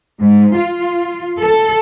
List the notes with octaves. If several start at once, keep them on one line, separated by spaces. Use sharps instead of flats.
G#2
F4
A4